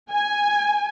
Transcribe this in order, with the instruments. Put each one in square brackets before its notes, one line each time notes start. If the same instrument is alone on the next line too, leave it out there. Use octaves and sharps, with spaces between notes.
[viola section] G#5